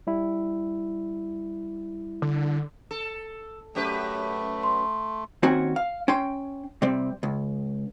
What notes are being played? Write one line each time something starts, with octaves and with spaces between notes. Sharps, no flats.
G3 E4
D3
A4
F#2 A3 G4 B4
C6
D#2 C4 C#4 F#4 G#5
F5
C#4 G5 C6
C3 G3 C4
C#2